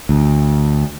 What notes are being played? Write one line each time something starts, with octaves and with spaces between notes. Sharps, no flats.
D2